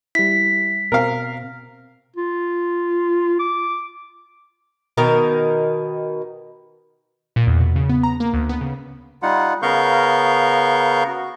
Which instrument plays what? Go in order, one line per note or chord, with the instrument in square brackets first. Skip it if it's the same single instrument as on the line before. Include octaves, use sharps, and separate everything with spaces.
[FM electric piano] G3 E4 [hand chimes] B6
[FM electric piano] B2 C4 [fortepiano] A#4 F5
[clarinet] F4
D6
[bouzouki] B2 D#3 A#4
[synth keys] A#2
E2
B2
C#3
B3
A#5
A#3
D2
B3
C#3
[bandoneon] G3 D#4 F4 F#5
C#3 B3 A#4 F5 C#6 G6
F#4